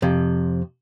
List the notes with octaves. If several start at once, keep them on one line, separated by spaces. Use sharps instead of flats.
F2 C3